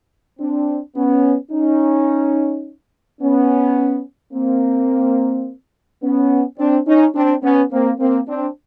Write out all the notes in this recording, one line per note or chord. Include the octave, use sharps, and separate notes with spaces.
C4 D4
B3 C#4
C#4 D#4
B3 C#4
A#3 C4
B3 C#4
C4 D4
C#4 D#4
C4 D4
B3 C#4
A#3 C4
A#3 C4
C4 D4